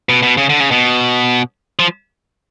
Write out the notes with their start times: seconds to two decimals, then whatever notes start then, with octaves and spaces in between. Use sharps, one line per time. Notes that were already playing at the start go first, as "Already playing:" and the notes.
0.09 B2
0.23 B2
0.37 C#3
0.49 D3
0.60 C#3
0.71 B2
1.79 F3